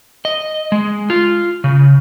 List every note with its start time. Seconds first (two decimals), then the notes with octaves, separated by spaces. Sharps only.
0.25 D#5
0.72 G#3
1.10 F4
1.64 C#3